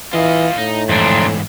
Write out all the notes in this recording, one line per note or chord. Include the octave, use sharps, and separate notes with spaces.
E3 F4 D#5 F5
A2 D#4
F2 G#2 E3 D4 A#5 C6